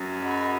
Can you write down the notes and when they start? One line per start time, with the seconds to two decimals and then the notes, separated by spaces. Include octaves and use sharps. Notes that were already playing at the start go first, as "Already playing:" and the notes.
Already playing: F#2
0.22 G#4 D#5 F#5 B5